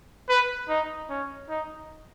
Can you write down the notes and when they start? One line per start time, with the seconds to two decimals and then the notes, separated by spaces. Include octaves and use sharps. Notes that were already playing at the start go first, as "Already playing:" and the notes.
0.29 B4
0.69 D#4
1.10 C#4
1.49 D#4